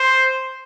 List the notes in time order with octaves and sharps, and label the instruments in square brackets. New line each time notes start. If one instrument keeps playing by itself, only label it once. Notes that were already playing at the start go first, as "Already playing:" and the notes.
Already playing: [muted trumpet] C5